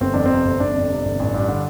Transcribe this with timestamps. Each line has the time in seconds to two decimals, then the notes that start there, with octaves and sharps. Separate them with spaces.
0.01 G1 C4
0.14 F2 D4
0.26 C3 C4
0.45 G1
0.60 G1 D4
0.75 F2
0.90 C3
1.05 G1
1.19 A1
1.34 G2
1.48 D3